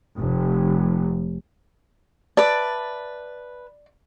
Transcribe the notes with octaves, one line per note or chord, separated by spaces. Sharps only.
F1
B4 D5 E5 A5